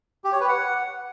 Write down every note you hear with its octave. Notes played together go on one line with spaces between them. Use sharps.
G4
C#5
B4
F#5